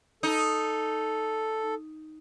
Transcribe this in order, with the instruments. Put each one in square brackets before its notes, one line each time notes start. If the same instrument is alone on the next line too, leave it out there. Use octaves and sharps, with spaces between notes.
[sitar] D#4 [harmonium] A4